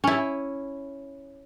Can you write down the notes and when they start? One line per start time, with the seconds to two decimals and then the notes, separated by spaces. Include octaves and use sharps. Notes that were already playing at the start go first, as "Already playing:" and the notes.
0.04 C#4 E4